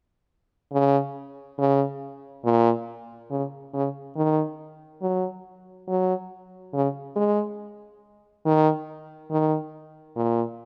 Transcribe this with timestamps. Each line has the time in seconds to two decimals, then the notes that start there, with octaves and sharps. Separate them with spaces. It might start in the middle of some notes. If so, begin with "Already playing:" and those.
0.72 C#3
1.58 C#3
2.45 A#2
3.30 C#3
3.74 C#3
4.16 D#3
5.02 F#3
5.88 F#3
6.74 C#3
7.16 G#3
8.45 D#3
9.30 D#3
10.16 A#2